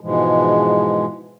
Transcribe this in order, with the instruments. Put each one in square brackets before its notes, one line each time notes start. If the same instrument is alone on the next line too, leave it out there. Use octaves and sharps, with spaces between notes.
[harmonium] G#2 B2 E3 F3 G#3